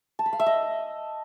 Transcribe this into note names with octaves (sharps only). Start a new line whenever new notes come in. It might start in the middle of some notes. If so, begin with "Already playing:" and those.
A5
B5
F5
E5
D#5